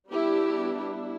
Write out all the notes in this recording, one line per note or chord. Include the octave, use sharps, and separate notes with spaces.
G3 B3 D4 E4 G4
E4